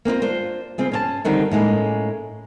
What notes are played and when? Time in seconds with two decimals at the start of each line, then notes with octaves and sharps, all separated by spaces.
0.05 A#3 C4 D#4 F4
0.22 D4 F4 C5
0.78 C#3 C4 F4 G#4
0.92 C#4 C#5 A5
1.25 D3 D#3 G3 C4
1.51 A2 G#3 A#3 C#4